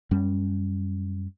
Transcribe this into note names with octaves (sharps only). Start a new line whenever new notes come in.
F#2 G3 C#4